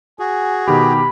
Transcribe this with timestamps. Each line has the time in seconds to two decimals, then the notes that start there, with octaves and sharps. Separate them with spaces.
0.19 F#4 G#4 G#5
0.68 B2 D#3 G4 B5